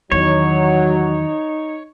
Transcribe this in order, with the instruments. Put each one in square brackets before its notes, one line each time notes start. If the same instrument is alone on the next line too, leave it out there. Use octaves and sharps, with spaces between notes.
[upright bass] E2 D#3 [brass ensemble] F#3 [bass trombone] D#4 [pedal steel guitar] C#5